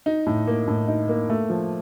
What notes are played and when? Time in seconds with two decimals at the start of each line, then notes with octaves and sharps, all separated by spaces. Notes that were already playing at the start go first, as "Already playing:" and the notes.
0.06 D#4
0.26 A2
0.47 A#3
0.67 A2
0.88 D#4
1.09 A#3
1.30 A3
1.50 F3